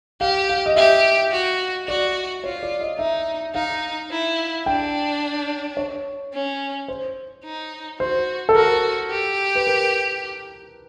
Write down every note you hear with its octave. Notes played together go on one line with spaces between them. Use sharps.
G4 F5
F5
D#5
G4 E5
F#4
F#4 D5
F4 C#5
D5
D#5
D#4 E5
D#4 F5
E4
D4 G5
C#5
C#4
C5
D#4
F#4 C5
A4
F#4 A#4
G4
B4
A#4